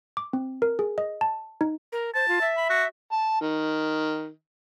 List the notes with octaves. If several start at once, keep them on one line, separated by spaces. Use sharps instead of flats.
D6
C4
A#4
G#4
D#5
A5
D#4
A#4
C5 A5
F4
E5
B5
F#4
A5
D#3